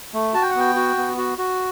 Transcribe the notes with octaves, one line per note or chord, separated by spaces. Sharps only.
A3
F#4 A5
G5
F#5
B3 G5
F#4
B3
F#4
F#4